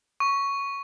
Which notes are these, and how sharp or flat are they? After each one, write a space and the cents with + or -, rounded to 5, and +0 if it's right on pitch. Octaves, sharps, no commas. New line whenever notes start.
C#6 +5